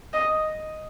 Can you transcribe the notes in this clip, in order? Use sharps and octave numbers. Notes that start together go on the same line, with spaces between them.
D#5